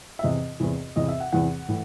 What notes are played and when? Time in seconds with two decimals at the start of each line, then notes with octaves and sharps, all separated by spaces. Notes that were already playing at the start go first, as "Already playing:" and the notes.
0.19 E5
0.23 E2 C3 E3 D#5
0.60 E2 C3 E3
0.96 E2 C3 E3 D#5
1.08 E5
1.20 F#5
1.32 E2 C3 E3 F#5
1.68 A2 E3